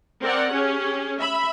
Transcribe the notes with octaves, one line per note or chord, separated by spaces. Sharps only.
C4 A#4 D5 F#5
C#4 G4 G#4
E5 B5